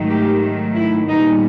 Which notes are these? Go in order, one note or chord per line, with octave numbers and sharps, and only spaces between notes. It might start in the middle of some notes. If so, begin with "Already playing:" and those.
Already playing: G#2 D#3 F#3 A3
G4
E4
A#2 G3 B3 D#4